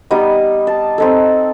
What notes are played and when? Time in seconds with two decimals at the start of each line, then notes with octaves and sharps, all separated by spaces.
0.11 G3 B3 D#4 D#5
0.67 A5
0.98 C4 D#4 A4